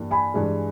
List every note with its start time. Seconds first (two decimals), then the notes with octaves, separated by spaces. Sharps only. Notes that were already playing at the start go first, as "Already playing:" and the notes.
Already playing: G2 E3 G3 A#3
0.11 G#5 B5
0.34 G2 E3 G#3